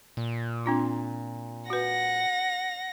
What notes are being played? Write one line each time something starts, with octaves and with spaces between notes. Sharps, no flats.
A#2
C4 D4 F4
F#4 B4 F#5 A#6